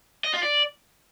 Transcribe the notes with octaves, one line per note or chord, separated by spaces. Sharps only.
D#5
F4
D5